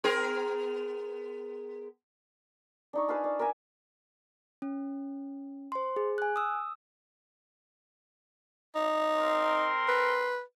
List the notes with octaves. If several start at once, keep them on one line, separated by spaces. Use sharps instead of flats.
B3 G#4 A#4
D4 D#4 C#6
G#4 B4 F5 A5
D5
A#4 D5 E5 G#5
C#4
C5 C6
G#4
G#5 F#6
D#6 E6
D#4
C4 A#4 C6
B4